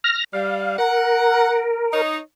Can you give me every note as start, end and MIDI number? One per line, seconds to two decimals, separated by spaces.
0.04 0.24 89
0.04 0.24 94
0.33 0.78 55
0.33 0.76 77
0.78 2.02 70
0.78 1.64 78
1.93 2.18 63
1.93 2.18 73